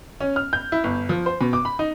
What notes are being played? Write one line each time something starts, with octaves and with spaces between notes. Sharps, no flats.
C#4
F6
G6
E4
G1
F3
C5
B2
D6
B5
D#4